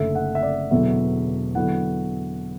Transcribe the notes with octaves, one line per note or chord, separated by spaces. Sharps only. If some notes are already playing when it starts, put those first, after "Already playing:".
Already playing: F#1 F#2 D3 A3 E5
F#5
E5
D5
E1 E2 D3 F#3 B3 E5
D3 F#3 B3 E4 F#5